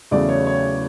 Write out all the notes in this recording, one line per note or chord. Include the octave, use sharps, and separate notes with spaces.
E2 C#3 F#3 A3 D5
C#5
C#5